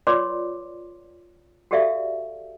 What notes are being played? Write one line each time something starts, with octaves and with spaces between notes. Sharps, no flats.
F4 B4 C#5 D5 C6 D6
F#4 G4 A4 D5 E5 F5